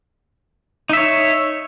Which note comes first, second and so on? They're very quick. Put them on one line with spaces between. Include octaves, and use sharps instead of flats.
D#4 E5 C#5